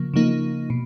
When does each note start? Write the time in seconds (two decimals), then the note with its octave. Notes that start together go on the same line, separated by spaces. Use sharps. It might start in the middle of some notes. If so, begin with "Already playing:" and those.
Already playing: C#3 F3 A#3
0.14 C#3 F3 A#3 D#4
0.70 B2